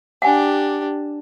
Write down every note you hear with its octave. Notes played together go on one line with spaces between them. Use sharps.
D4 G4 F#5 G#5